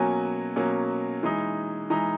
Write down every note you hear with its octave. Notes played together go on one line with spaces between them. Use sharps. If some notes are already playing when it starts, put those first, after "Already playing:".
Already playing: B2 F#3 A#3 C#4 G#5
B2 F#3 A#3 C#4
E3 G#3 D#4
E3 G#3 D#4 A#5